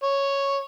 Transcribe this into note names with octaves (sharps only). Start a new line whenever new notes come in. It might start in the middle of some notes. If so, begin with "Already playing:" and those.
C#5